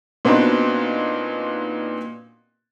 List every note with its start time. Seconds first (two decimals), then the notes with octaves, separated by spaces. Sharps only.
0.25 A#2 B3 C4 D4 D#4 F#4